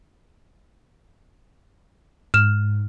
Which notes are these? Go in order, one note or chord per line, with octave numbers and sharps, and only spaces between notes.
G#2 F6 E7